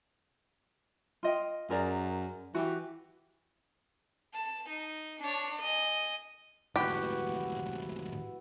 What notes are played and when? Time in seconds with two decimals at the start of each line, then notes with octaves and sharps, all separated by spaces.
1.23 F4 D#5 G5
1.70 F#2 G#4 A#4 D5
2.55 E3 F#4 G4
4.34 A5
4.69 D#4
5.20 D4 C#5
5.60 D#5 G#5
6.76 D2 G#2 E4 F#4 G4 B4